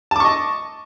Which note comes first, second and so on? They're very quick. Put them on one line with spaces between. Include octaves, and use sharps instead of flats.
A5 D6 C#6 D#5